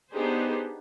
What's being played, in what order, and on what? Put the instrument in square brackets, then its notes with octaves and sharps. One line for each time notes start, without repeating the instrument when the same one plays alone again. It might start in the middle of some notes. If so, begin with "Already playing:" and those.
[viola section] B3 D4 D#4 G4 G#4 C5